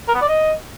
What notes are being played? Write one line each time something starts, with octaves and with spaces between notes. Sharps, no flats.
A#4
B3
D5
D#5